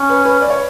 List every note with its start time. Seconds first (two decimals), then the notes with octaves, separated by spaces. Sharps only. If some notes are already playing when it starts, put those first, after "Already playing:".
Already playing: C#4
0.10 B4
0.25 B4
0.42 D5
0.50 C#5